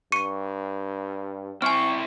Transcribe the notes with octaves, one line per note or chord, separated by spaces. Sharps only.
G2 C#6 C#7 D#7
C4 E4 C5 G#5 C#6 F6